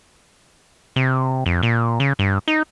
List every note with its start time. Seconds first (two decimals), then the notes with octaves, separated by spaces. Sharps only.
0.96 C3
1.46 F2
1.63 A#2
2.00 C#3
2.19 G2
2.48 D#4